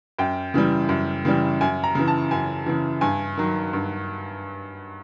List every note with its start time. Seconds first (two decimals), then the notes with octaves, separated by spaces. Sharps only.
0.19 F#2 G5
0.54 C#3 E3 G3
0.89 F#2
1.25 C#3 E3 G3
1.61 F#2 G#5
1.84 A#5
1.95 C#3 E3
2.08 A5
2.31 F#2 G#5
2.66 C#3 E3
3.01 G2 G#5
3.37 D#3 F#3
3.73 G2